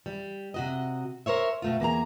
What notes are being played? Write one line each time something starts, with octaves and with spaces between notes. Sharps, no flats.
G3
C3 F#4 D#5
A#4 C5 C#5 E5
B2 A3 F4
E2 A#3 G#4 A#5